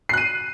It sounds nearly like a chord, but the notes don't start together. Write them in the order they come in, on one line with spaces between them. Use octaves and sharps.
C7 F#6 D#7